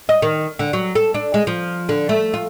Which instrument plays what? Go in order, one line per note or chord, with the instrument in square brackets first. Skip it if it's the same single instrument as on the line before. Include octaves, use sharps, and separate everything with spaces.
[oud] D#5
D#3
D3
F#3
A4
D4
G#3
F3
D3
A3
F4